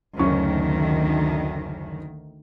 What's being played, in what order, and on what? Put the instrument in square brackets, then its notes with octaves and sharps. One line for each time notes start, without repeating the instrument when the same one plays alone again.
[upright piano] F#1 C#4 C#6 [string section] D2 D#3